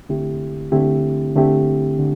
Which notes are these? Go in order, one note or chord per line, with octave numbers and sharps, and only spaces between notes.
D3 A3 C4 E4 G4
D3 A3 C4 E4 G4
D3 A3 C4 E4 G4
D3 A3